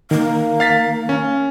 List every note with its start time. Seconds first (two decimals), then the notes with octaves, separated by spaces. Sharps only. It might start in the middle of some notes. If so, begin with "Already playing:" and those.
0.11 D#3 A#3
0.60 F5 A6 B6
1.09 C#4